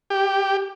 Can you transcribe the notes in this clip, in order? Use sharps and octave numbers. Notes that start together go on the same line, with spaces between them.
G4